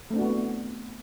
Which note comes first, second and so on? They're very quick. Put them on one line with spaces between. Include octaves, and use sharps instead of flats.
A3 C4 D4 F#4 B3